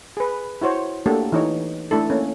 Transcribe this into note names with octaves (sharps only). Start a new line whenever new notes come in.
G#4 B4
E4 F#4 C5 C#5
A3 A#3 D4 F#4 G4 A4
E3 D#4 C#5
A3 D4 E4 A4
A#3 C#4